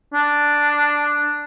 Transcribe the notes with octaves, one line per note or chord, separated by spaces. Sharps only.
D4